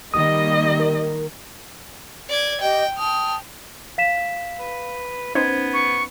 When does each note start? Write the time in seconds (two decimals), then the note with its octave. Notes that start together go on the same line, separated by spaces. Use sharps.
0.14 D#3 G3 A#3 D#5 D#6
0.80 A#4
2.30 D5 G#6
2.61 G4 D#5 G5
2.98 G5 A5 D#6 F6
3.98 F5 B6 E7
4.59 B4
5.35 B3 C#4 D#4 C5 G#6
5.74 C#6